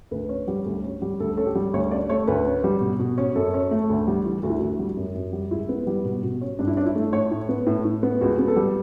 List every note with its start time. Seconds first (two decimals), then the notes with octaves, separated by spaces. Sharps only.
0.11 D2 B4
0.29 C#4
0.48 G3
0.66 D2
0.83 C#4
1.02 G3
1.20 D2 A4
1.37 C#4 A4
1.46 G4
1.55 G3
1.73 D2 C#5
1.91 C#4 D5
2.09 A3 C#5
2.27 D2 B4
2.46 C#4
2.64 G3
2.81 B2
3.00 B2
3.18 C#4
3.36 F#2 A4
3.54 C#4
3.71 A3
3.90 D2
4.08 G3
4.25 E3
4.43 D2 F#4
4.50 E4
4.58 D2 F#4
4.79 G3
4.97 F#2
5.15 F#2
5.33 G3
5.51 C#2 E4
5.69 B3
5.87 G3
6.05 B2
6.23 B2
6.41 C#4
6.59 G2 D4
6.68 E4
6.77 C#4 D4
6.86 E4
6.95 A3
7.13 A2 C#5
7.31 A2
7.49 B3
7.67 A2
7.85 A2
8.03 B3
8.21 C#2 F#4
8.39 B3
8.48 A4
8.56 G3